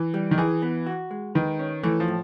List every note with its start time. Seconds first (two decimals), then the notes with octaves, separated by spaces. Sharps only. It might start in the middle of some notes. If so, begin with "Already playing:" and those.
Already playing: E3
0.14 G3
0.31 D#3
0.38 E3 G#4
0.62 B3
0.87 F#4
1.11 G#3
1.35 D#3 B4
1.59 C#4
1.83 E3 A3
2.00 F3
2.08 A2